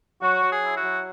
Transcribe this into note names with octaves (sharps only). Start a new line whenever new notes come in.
F#3 F#4
F#3
G#4
E4
F#4
F#3